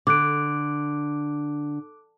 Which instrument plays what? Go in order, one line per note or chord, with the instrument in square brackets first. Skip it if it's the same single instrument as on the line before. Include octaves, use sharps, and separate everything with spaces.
[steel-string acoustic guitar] D3 [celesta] D6 F#6 D7